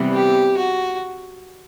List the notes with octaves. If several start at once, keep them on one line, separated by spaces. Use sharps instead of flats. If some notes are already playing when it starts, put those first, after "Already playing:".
Already playing: C3 E3 G3 B3
G4
F#4